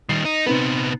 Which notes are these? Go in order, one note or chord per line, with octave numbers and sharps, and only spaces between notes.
D#3 G3 C7
D#4
C3 B3 C4 D#4 B4